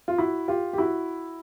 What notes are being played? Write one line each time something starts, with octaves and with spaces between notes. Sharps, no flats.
F4
E4 F#4
F4 G4
G4
E4 F#4